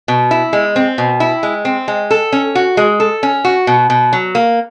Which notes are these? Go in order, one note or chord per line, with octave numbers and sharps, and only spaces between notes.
B2
E4
G#3
C4
B2
E4
G#3
C4
G#3
A4
C#4
F#4
G#3
A4
C#4
F#4
B2
B2
F#3
A#3